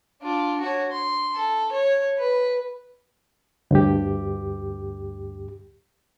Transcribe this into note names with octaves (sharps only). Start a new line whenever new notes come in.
D4 F4
F#4 C#5
C6
A4
C#5
B4
D2 G2 G4